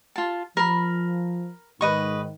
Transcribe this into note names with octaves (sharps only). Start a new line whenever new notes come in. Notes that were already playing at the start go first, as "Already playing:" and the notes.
F4 A5
F3 A#4 B5
G#2 D#3 B4 D#5 C#6